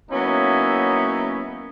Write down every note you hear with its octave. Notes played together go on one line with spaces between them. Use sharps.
F#3 A#3 B3 C#4 D#4 E4